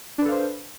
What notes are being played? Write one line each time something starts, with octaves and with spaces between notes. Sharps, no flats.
D4 A4 B4 C5 F5